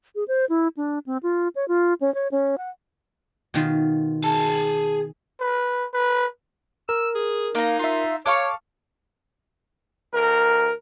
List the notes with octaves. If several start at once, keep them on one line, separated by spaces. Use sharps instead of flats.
G#4
C5
E4
D4
C4
F4
C#5
F4
C#4
C#5
C#4
F#5
B2 D#3 F4
G#4 A5
B4
B4
A#4 E6
G#4
A#3 D#4 A#5
F4 E5
A4 C#5 F5 C#6 D6
D2 A#4